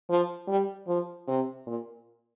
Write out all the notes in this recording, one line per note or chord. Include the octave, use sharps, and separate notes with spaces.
F3
G3
F3
C3
A#2